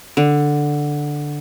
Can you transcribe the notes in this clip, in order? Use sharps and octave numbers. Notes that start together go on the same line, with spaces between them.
D3